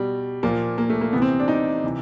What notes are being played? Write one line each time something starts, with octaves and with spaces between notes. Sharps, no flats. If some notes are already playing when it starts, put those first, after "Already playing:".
Already playing: B2 G3
A#2 F3 A#3
A#3
A3
A#3
C3 E3 B3
C4
D4
D#4
C3 E3